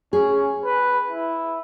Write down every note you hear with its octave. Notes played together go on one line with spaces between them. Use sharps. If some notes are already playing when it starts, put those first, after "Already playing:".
C#4 G#4
B4
E4